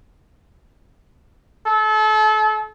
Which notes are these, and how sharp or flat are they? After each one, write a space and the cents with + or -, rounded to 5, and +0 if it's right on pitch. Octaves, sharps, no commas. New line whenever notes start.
A4 -35